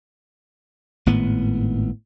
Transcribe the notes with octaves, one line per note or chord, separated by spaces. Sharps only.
G#1 A2 B3